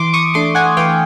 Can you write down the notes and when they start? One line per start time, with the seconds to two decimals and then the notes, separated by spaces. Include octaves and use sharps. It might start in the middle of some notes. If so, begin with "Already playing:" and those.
Already playing: E3 C6 D6
0.13 C#6 D#6
0.34 A3 D4 C6 D6
0.55 F#5 G#5
0.77 E3 F5 G5